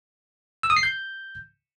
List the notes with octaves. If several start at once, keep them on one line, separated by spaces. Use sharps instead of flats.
E6
D#6
C7
G6